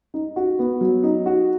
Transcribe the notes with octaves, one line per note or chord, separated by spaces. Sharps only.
D#4
F#4
B3
F#3
D#4
F#4